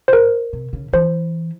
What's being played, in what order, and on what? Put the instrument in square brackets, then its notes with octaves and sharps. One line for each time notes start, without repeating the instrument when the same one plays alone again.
[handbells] C5
[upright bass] G#2 [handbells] A#4
[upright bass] C3
C#3
[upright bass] E3 [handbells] C5